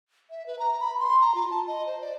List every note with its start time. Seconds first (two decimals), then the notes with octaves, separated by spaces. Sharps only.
0.30 E5
0.46 B4
0.59 A#5
0.80 B5
1.00 C6
1.20 A#5
1.35 F4
1.50 A5
1.67 D#5
1.87 C5
2.01 D5